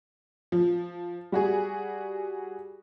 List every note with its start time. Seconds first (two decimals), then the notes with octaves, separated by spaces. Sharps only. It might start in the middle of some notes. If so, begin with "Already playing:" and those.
0.52 F3
1.32 G3 F#4 G#4